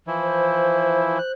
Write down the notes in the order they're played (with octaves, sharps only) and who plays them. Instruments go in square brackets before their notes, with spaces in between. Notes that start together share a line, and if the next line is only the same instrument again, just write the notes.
[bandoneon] E3 F3 E4
[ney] C5
[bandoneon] F#6